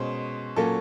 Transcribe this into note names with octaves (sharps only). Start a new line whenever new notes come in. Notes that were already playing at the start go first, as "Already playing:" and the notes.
Already playing: B2 G#3 C#4 C5
A#2 F#3 A#3 C#4 A4